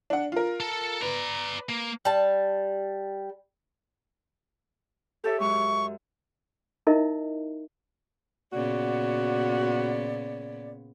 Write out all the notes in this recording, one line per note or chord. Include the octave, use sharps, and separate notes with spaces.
D4 F#5
F4 A#4
A4
B4 D5 A#5
A#3
G3 A5
G4 A4 C#5 E5
F#2 G#3 C#6
D#4 E4 A#4 D#5 E5
A#2 C#3 B3 F#4 D5